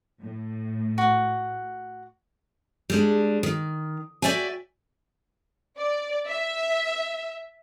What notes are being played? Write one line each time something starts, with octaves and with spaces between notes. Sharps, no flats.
A2
F#4
G3 G#3 D4
D#3
F#4 D5 E5 G5 G#5
D5
E5